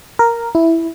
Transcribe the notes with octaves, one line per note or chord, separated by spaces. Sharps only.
A#4
E4